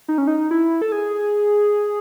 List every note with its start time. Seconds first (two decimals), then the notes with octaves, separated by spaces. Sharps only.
0.08 D#4
0.18 C#4
0.27 D#4
0.51 E4
0.82 A4
0.92 G#4